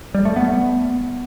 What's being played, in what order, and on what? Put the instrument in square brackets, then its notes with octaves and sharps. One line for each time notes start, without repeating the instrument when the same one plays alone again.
[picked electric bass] G3
A3
B3